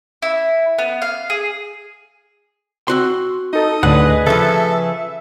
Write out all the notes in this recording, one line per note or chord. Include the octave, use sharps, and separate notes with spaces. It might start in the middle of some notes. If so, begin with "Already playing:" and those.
E4
B3
F5
G#4
C4 F#4 C6
D#4 A4 D#5
D2 A2 D3 G#4 B4 F#5
C#3 F3 A4 E5